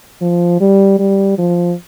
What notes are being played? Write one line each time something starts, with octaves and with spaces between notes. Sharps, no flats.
F3
G3
G3
F3